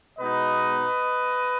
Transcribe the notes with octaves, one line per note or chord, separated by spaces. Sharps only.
B2 G#3 B3 D#4 B4 D#5